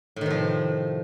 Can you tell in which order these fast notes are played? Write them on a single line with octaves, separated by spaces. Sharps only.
A2 D#3 C3 F3